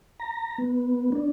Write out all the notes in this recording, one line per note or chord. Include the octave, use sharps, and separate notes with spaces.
A#5
B3
D4